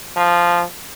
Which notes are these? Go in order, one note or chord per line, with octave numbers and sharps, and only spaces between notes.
F3